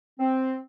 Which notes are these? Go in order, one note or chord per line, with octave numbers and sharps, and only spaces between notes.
C4